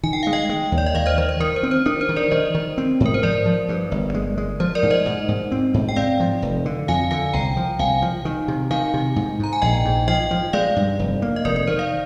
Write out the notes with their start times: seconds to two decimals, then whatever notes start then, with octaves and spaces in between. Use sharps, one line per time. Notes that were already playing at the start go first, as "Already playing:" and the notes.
0.03 D#3 G#5
0.13 G5
0.23 G#3 F5
0.33 D#5 G5
0.49 G#3
0.72 D#2
0.78 D5
0.86 D#5
0.94 D#3 D5 F5
1.06 C5 D#5
1.18 D#3 C5
1.29 C5
1.40 D#3 A#4
1.56 C5
1.63 C4
1.71 C5
1.86 D4 A#4
2.01 C5
2.09 D#3
2.16 A#4 D5
2.31 D#3 C5 D#5
2.55 D#3
2.78 C4
3.00 G#2
3.06 A#4
3.14 C5
3.23 F3 A#4 D5
3.46 F3
3.69 G2
3.91 G1
4.14 G#3
4.38 G#3
4.60 F3 C5
4.75 A#4 D5
4.83 G#2
4.90 C5 D#5
5.06 G#2
5.28 G#2
5.52 C4
5.74 G#2
5.89 G5
5.96 C4 D5 F5
6.20 F3
6.42 F1
6.65 D3
6.88 F2 F5 G#5
7.11 D3 F5 G#5
7.33 C2 G5 A#5
7.56 F3
7.79 C2 F5 G#5
8.02 F3
8.25 D#3
8.48 C3
8.71 D#3 F5 G#5
8.94 C3
9.16 G#2
9.39 G#2 A#5
9.53 G#5
9.62 A#1 D#5 G5
9.85 G#2
10.08 F3 D#5 G5
10.31 F3
10.53 G#3 D5 F5
10.76 G2
10.99 F1
11.22 A#3
11.36 D#5
11.45 F1 A#4 D5
11.56 A#4
11.67 D#3 C5
11.79 D5 F5